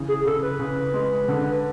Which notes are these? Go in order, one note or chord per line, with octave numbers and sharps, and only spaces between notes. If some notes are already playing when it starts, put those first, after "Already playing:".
Already playing: C#3 E3
G#4
C#3 A4
B4
C#3
G#3
D3